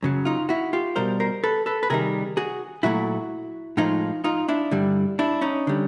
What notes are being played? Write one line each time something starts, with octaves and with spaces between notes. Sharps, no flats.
F#2 C#3 F#3
D#4 F4
E4 F#4
F4 G4
B2 G3 A#4 C5
A#4 C5
A4 B4
A4 B4
B4
C3 D#3 G3 G#4 A#4
F#4 G#4
A#2 F#3 A3 E4 F#4
A2 F3 G#3 D#4 F4
D#4 F4
D4 E4
G2 D3 G3
D4 E4
C#4 D#4
D3 G3